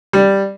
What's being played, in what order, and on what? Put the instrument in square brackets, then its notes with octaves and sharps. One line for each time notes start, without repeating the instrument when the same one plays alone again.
[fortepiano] G3